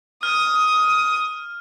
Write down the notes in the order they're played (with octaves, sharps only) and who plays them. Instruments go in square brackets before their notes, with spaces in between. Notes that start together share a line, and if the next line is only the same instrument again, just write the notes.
[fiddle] D#6 [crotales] F6